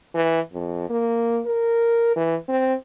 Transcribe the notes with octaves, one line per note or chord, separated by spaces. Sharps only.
E3
F2
A#3
A#4
E3
C4